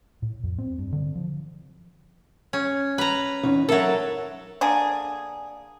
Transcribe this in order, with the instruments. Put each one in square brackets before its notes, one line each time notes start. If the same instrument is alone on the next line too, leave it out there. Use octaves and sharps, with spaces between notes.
[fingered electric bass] A2
F2
C4
G2
D3
F3
[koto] C#4
B4 A#5
[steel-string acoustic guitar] E2 C#4 D#4
[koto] F#3 A4 [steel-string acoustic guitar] A#4 E5
[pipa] D3 A#3 G#4